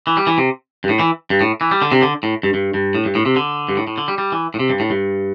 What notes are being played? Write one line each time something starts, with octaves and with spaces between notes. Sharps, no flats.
E3
G3
E3
C3
G2
A2
E3
G2
A2
E3
G3
D3
C3
D3
A2
G2
G2
G2
A2
G2
A2
C3
D3
G2
A2
A2
D3
G3
G3
E3
A2
C3
G2
A2
G2